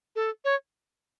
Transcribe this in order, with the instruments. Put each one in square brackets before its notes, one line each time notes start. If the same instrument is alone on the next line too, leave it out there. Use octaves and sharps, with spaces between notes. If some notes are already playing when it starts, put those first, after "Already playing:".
[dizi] A4
C#5